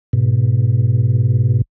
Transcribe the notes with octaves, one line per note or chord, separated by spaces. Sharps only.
G#2 B2